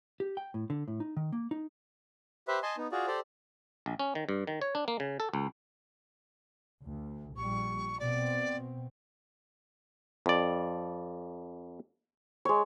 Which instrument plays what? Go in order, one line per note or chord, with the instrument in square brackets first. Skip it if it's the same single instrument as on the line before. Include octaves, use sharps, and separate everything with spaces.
[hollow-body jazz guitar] G4
G5
A2
D3
A2
D#4
D#3
A#3
D#4
[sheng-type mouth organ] G4 B4 C5 E5
D#5 G#5 A5 C6
B3 D#4
F4 F#4 G#4 D5
G4 A4 C5 D5
[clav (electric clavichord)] A#1
C#4
D#3
G2
D#3
C#5
D4
A#3
C#3
A4
C#2
[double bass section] D2
[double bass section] A#1 G3 [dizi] C#6
[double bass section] B2 C4 [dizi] D5
[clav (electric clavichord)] F2 D5
[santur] G#3 C#5